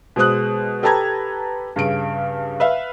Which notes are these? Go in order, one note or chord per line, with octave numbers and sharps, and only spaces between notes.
B2 G#3 C5 D#6 F#6
G4 A4 B4 A5 A#5 G#6
G2 C#3 D7
B4 E5 F5